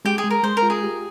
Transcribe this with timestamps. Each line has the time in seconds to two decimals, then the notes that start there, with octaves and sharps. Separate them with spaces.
0.05 G#3 G4
0.18 G#4
0.24 G#3
0.31 A#4
0.43 G#3 C5
0.57 A#4
0.63 F4
0.70 G#4
0.83 G4